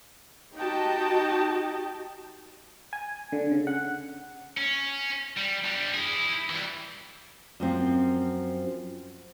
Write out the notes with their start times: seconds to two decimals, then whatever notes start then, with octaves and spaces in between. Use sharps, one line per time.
0.55 D#4 F#4 G4 D#5 G5 A5
2.93 G#5
3.32 D3
3.51 C#3
3.67 F#5
4.57 C#4
5.38 G3
5.65 D3 G3
5.94 E4 G#4
6.50 E3 G3
7.60 F#2 F3 C4